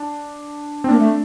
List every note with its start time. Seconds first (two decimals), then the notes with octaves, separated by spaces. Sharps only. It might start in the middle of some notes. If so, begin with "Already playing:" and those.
Already playing: D4
0.84 C4
0.89 A#3 D4
0.99 A3